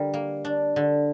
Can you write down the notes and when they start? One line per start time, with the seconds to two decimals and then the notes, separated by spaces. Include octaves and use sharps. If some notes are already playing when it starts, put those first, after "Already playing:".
Already playing: D3 G3 A#4 D5
0.14 A#3
0.45 D4
0.76 D3